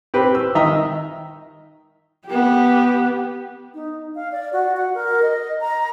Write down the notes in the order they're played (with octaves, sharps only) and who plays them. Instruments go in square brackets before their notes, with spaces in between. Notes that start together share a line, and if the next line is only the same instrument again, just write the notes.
[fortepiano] C4 G4 B4
E6
D#3 D#5 E5 A#5
[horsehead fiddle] B3 G4
[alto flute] D#4
F5
D5
F#4
F#5
A#4
D#5
A#5